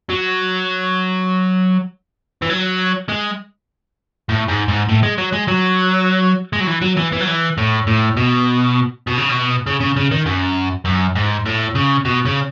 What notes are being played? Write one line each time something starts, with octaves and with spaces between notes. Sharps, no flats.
F#3
E3
F#3
G#3
A2
G#2
G#2
A2
G#3
F#3
G#3
F#3
G#3
F#3
E3
F#3
E3
E3
F#3
E3
A2
A2
B2
B2
C#3
B2
C#3
C#3
C#3
D#3
F#2
F#2
G#2
A2
C#3
B2
C#3